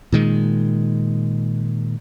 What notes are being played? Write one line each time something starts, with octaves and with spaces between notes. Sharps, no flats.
A#2 D#3 G#3